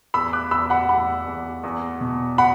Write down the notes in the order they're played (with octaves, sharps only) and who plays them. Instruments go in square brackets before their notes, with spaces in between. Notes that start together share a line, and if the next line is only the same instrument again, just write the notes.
[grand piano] E2 B5 E6
D6 F#6
E2 B5 E6
F#5 B5
E2 F#5 B5
E2
E2
B2
F#5 B5